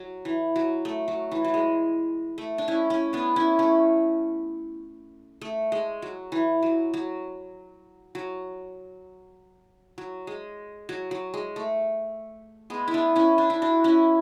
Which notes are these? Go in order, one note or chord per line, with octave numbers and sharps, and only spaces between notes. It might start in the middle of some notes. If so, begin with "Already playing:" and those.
Already playing: F#3
E3
F#3
A3
F#3
E3
F#3
G#3
A3
D4
C#4 E4
C#4 E4
B3 D4
C#4 E4
A3 C#4
A3
G#3
F#3
E3
F#3
F#3
F#3
F#3
G#3
F#3
F#3
G#3
A3
G#3 B3
E4
B3 D4
C#4 E4
D4
E4
D4 F#4
C#4 E4